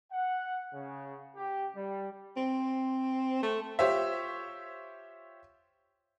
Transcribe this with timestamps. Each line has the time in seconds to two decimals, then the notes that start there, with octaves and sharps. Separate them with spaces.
0.12 F#5
0.74 C#3
1.36 G4
1.75 G3
2.37 C4
3.43 A3
3.79 F4 G4 C5 C#5 E5